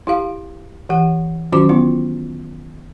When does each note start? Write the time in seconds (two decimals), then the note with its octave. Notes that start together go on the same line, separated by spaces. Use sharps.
0.07 E4 G4 F5
0.89 E3 G4 F#5
1.52 D#3 F#3 C#4 F4 F#4 D6
1.69 B3 E4 F4